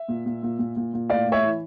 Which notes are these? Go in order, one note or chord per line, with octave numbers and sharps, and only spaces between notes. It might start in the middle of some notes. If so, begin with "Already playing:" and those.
Already playing: E5
A#2
A#2
A#2
A#2
A#2
A#2
A2 D5 F5
A2
C#5 E5
E3